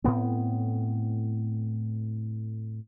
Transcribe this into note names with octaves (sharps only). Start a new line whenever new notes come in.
A2 B3 C4